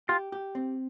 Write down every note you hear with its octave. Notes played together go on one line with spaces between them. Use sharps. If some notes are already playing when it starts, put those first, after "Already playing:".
F4 G4
G4
C4